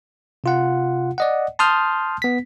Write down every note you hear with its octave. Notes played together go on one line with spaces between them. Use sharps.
C3 F4 F#5
D5 D#5 F#5
A5 C6 D#6 F6 G6
B3 B6